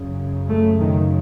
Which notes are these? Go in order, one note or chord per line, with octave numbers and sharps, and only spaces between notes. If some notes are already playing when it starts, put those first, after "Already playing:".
Already playing: F#2 C#3
A3
D#3